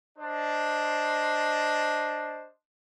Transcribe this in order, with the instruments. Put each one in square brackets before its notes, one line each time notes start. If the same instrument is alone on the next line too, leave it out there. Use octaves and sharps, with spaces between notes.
[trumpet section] D4 C5 D#5